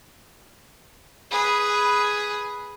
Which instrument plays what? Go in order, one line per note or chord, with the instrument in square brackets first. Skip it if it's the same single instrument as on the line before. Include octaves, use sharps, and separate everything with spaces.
[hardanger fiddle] G#4 B4